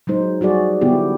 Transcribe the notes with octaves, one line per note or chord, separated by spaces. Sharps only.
F#3 G#3 D#4 C5
G3 F#4 G#4 D5
D3 B3 E4 G4